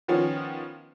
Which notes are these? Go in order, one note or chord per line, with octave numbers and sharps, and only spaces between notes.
D#3 F3 B3 C#4 F4